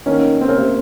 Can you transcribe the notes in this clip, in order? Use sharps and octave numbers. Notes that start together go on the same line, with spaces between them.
D#3 A#3 C#4
C4
C#3 A#3
C3